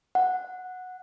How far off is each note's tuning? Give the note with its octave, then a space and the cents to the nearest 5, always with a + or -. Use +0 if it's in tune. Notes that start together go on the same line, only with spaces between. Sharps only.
F#5 -10